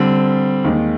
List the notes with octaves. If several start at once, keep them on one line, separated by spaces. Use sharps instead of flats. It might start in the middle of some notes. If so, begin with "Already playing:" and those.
Already playing: D3 G3 C4
D#2 D#3 G#3